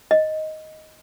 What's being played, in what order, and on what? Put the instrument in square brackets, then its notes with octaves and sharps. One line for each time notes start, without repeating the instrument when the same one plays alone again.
[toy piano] D#5